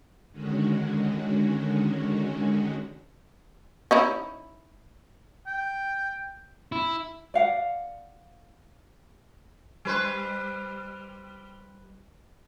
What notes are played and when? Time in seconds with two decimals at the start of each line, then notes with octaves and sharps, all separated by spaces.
0.31 D3 D#3 G#3 C#4 F#4
3.91 C#4 D#4 E4
5.47 G5
6.72 E4
7.34 D5 F5 F#5
9.85 G3 B4 C5